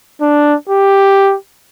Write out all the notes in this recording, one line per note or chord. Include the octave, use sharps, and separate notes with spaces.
D4
G4